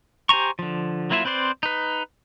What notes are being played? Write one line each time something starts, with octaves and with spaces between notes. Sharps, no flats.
G4 C5 G#5 A#5 C#6
D3 F3
F#3 A#3 E4 F4 E5
C4 B4 C5 D5 C6
D#4 B4